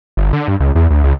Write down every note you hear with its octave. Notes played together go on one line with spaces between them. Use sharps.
G1
D3
G2
C#2
E2
D2
C#2